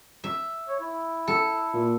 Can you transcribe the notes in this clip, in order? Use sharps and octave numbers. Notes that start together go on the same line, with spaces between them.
E5
C#5
E4
A4
A#2